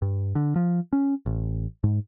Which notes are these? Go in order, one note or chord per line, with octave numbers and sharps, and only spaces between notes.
G2
D3
F3
C#4
A1
G#2